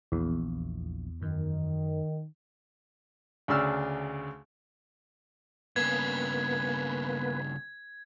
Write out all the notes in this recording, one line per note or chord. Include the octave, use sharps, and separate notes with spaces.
A#1 E2
F#2 D#3
D2 C#3 D4 E6 F6
G2 C#3 A#3 B3 B4 G#6